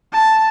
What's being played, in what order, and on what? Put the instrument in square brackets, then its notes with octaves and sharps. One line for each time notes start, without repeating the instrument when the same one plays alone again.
[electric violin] A5